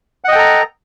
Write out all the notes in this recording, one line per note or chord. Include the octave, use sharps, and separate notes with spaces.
A4 D#5 F#5 G5 A#5